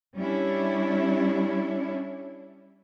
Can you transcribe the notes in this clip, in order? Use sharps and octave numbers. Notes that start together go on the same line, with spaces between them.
G3 C#4 D4 E4